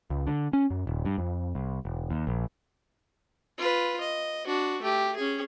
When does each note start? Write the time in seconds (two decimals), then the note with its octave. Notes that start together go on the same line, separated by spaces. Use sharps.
0.10 C#2
0.27 D3
0.53 C#4
0.70 F#2
0.87 D#1
1.05 G2
1.18 F2
1.55 C2
1.85 E1
2.11 D#2
2.27 A#1
3.58 F4 B4
4.00 D#5
4.47 D4 F#4
4.82 A3 G4
5.16 C#4 G#4